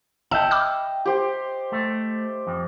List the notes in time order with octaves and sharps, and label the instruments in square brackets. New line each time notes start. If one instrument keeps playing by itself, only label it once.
[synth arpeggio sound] G1 A5 [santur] D#5 [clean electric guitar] E5 G5
[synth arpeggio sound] B5 D6 F6
[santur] G4 C5
[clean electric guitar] A3
F2